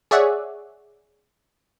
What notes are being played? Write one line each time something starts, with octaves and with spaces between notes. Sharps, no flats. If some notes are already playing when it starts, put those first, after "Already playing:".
G#4 C#5 D5 E5 F#5